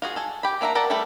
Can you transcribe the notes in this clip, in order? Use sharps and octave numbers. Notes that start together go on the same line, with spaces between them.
F4 F#4 G#4
A4 G#5
G4 B5
A#3 D4 E5 F#5 A#5
A4 A#4 D5 F#5 A5
G3 A3 A4 B4 E5